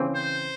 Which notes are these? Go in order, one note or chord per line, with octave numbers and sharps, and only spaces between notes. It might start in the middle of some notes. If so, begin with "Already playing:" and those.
Already playing: C#3 E3 C4
C5